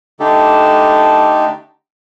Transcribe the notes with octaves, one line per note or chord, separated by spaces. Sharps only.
D3 A3 D4 D#4 G4 A4